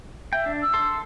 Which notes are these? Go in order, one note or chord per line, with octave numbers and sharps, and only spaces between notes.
E5 G5
D4
E6
A4 C6